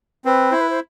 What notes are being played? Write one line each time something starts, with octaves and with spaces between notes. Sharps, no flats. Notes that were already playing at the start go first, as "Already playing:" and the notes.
C4 B4
E4 C5
B4
C5